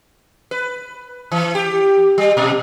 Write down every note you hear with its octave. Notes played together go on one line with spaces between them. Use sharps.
B4
E3
G4
G3
A#2